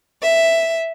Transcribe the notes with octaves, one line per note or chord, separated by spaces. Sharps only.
E5